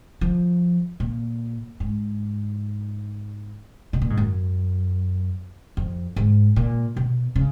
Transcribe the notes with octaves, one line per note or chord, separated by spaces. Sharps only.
F3
A#2
G#2
B2
A#2
G#2
F#2
F2
G#2
A#2
B2
C#3